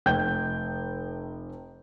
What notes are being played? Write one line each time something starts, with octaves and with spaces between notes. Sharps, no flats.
F1 G5 G6